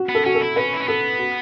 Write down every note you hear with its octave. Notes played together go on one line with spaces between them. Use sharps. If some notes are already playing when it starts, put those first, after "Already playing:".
Already playing: F#4
B3
A4
C#4 F#4
A4
E4
C#4 B4
E4
C#4
B3 A4
F#4